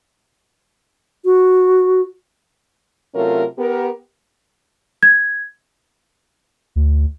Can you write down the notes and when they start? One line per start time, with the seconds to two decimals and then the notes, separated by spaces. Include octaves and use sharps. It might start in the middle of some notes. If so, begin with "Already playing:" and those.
1.25 F#4
3.15 C3 F#3 A3 C#4 F4 A#4
3.58 B3 G4 A#4
5.03 G#6
6.76 D2